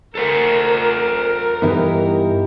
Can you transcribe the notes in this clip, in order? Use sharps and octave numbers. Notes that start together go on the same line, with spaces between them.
A4 A#4 C5 F#5
G2 E3 B3 D#4 E4 G4